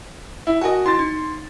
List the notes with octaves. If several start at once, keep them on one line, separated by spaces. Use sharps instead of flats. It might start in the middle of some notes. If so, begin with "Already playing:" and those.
E4
F#4 A#4 D#5 G#5 A5
E4 F#4 C6 A6
D#4